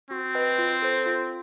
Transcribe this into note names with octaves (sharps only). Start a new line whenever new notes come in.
C4 F#4
B4 D#5 G5
F4
A4 C5
F4